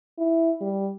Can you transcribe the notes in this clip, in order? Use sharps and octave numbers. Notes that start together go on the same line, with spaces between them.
E4
G3